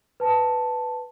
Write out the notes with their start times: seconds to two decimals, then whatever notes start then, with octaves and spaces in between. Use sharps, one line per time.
0.20 B4 A5